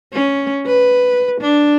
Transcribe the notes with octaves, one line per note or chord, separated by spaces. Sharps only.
C#4
B4
D4